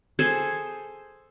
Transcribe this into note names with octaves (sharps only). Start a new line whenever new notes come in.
G#4 A4 C5